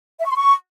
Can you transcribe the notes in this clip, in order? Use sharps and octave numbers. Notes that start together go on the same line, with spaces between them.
E5
C#6
C6
C#6